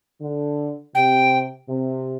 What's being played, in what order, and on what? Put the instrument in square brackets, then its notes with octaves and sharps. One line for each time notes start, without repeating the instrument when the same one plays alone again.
[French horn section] D3
[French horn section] C3 [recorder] G5
[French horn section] C3